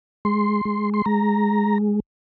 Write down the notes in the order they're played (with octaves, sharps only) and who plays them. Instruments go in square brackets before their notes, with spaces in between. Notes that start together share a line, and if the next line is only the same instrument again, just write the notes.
[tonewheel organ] G#3 C6
G#3
C6
G#3 A#5